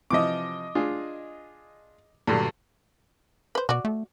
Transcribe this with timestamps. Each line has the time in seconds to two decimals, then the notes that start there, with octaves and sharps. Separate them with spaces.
0.10 C3 E3 F3 D#5 D6
0.75 D4 F4 G#4
2.27 G2 A#2 D3 F#3
3.55 B4 C5
3.69 B2 F#4 D5
3.85 A3